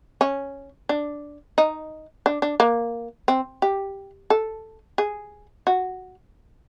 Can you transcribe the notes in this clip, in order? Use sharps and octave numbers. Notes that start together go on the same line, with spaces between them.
C#4
D4
D#4
D4
D4
A#3
C4
G4
A4
G#4
F#4